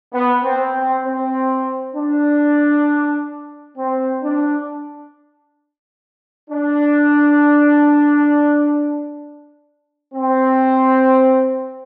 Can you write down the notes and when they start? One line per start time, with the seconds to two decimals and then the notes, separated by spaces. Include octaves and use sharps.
0.13 B3
0.43 C4
0.74 C4
1.05 C4
1.95 D4
3.77 C4
4.22 D4
6.50 D4
10.15 C4